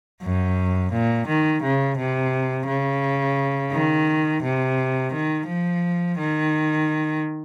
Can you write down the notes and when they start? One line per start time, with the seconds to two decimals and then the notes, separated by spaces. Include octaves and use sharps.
0.22 F#2
0.92 A#2
1.27 D#3
1.63 C#3
1.98 C3
2.67 C#3
3.72 D#3
4.43 C3
5.13 D#3
5.48 F3
6.18 D#3